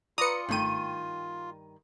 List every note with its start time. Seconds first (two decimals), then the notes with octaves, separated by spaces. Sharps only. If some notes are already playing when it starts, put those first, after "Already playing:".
0.18 F4 B4 D5 A#5 D#6 C#7
0.49 G#1 G2 D#3 A3 G5 D#7